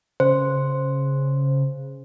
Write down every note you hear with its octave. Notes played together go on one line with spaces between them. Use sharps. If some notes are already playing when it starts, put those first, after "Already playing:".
C#3 C5